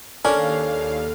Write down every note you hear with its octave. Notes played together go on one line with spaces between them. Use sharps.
D#2 C#4 D4 A4 A#4 F5